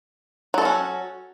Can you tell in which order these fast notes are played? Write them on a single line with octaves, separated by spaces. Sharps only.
F#3 A4 F#4 C#4